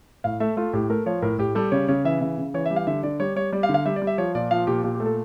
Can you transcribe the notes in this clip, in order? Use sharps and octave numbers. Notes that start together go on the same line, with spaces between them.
A2 F5
A3 E5
A3 F4
A2 G4
A3 A#4
F3 C#5
A2 A#4
A2 G4
G3 A4
C#3 C#5
C#3 C#5
E3 E5
C#3 E5
C#3
E3 C#5
E5
G3
F5
D3 E5
D3 D5
G3 C#5
G3 C#5
G3 D5
F5
D3
F5
G3 E5
D5
G3
E5
F3 C#5
A#2 D5
F3 F5
A#2 G4
A#2 G4
G4
A3
A4